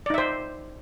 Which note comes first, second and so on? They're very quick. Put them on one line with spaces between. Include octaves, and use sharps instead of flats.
D5 D#4 E5 C5